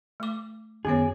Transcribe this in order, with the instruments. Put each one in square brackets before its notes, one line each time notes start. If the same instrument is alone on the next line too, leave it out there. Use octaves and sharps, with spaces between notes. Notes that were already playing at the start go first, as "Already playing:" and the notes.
[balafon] A3 D6
[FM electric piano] F#2 D#3 B3 [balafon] C#4 F#4 C#5 [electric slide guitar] G#4